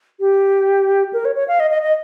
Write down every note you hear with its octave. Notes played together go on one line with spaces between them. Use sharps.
G4
A#4
C#5
C#5
F5
D#5
D#5
D#5